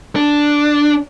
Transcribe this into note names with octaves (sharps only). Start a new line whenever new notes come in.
D4